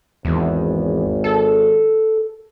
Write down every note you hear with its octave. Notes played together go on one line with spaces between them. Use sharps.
G#1 E2
A4